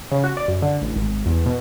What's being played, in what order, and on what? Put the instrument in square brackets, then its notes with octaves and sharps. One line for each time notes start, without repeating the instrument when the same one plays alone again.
[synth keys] C#3
F#4
D5
F#2
D3
A1
G#1
G#1
E2
B2